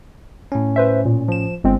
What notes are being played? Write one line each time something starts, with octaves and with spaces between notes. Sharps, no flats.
A2 C#4
B4 C5 E5
A#2
F3 E7
G1 G#3 C4